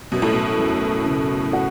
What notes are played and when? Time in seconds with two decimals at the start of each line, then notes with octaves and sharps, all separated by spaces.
0.12 F#2 B2
0.22 A2
0.33 B2
0.59 F#2
1.06 C#3
1.53 F#4